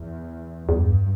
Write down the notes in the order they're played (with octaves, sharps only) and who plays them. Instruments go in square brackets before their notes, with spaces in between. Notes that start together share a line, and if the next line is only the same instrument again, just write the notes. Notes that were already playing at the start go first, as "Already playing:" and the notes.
Already playing: [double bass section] E2
[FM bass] E2 [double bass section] G2